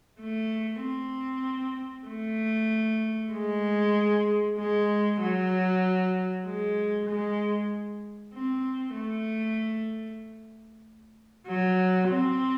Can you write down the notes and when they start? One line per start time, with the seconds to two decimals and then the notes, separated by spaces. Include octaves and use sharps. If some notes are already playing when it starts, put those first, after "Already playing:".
0.21 A3
0.82 C4
2.07 A3
3.33 G#3
4.58 G#3
5.21 F#3
6.47 G#3
7.09 G#3
8.34 C4
8.96 A3
11.47 F#3
12.09 C4